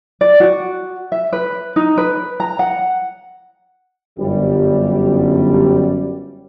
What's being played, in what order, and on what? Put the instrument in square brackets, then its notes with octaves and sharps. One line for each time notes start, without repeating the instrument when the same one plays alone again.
[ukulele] D5
F#4
E5
B4
D#4
B4
A#5
F#5
[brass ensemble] G1 F#2 G3